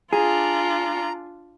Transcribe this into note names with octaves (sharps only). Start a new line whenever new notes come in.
D4 F4 G#4 A#5